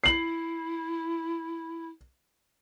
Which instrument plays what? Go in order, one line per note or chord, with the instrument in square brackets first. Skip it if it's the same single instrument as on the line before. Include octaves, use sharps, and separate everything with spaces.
[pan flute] E4 [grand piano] C7 F#7